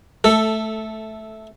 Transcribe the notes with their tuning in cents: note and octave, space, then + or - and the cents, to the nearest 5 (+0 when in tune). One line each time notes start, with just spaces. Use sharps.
A3 -10 A4 +5